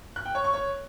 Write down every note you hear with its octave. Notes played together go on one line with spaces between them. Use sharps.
F#6
G5
C#5
C#6
C#5